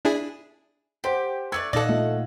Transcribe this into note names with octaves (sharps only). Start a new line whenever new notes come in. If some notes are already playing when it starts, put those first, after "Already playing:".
D4 E4 G#4
G4 C5 F#5
A3 D5 F#6 G#6
A#2 D#4 A4 D5 D#5 F5 F#5
A3 F4